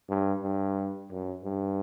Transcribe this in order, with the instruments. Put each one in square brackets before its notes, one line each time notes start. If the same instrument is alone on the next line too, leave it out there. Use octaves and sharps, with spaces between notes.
[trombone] G2
G2
F#2
G2